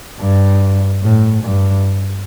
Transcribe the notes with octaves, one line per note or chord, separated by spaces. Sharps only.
G2
A2
G2